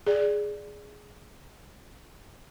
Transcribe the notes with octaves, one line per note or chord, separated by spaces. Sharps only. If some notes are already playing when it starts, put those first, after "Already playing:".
G#4 D5